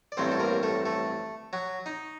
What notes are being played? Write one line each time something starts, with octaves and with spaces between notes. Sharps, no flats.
D5
A1 G2 F#3 A3 C4 C5
A4
A#3 A#4
A3 A4
A3 A4
F#3 F#4
D#4